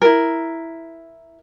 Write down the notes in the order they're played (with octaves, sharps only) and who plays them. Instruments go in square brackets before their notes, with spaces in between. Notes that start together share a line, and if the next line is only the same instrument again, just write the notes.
[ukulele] E4 A#4